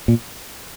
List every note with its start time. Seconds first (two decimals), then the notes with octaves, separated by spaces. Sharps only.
0.08 A#2